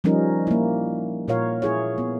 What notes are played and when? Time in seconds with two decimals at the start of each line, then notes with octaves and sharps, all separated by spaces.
0.04 F3 G3 C#4 D#4 A#4
0.47 A#3 E4
1.28 A#2 F4 A#4 C#5 F5
1.62 E4 G#4 C#5
1.98 B3